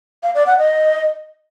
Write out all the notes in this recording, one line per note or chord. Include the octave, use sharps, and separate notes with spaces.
F5
D5
F#5
D#5